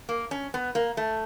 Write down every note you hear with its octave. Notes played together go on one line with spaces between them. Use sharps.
A#3
C#4
B3
A#3
A3